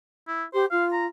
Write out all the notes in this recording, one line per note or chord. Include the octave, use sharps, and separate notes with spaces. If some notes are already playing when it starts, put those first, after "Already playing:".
E4
G4 C5
F4 F5
A#5